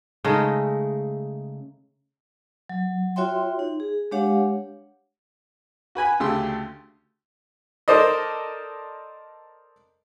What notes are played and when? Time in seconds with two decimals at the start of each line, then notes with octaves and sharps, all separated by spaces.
0.24 C#3 G#3 A3 D#4
2.69 F#3
3.16 F4 F#4 C#5 E5 G5 C6
3.59 D#4
3.80 G#4
4.11 G#3 D4 G4 C#5 F5 F#5
5.95 F#4 B4 G#5 B5
6.20 D2 C#3 A3 G4 C6 E6
7.88 A4 A#4 C5 D5 D#5